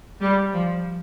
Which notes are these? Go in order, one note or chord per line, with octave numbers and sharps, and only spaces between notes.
G3
F3